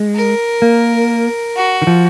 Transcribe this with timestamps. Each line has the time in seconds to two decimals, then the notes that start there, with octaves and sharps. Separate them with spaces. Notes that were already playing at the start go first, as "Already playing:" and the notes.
Already playing: G#3
0.15 A#4
0.62 A#3
1.56 F#4
1.82 D#3
1.87 F3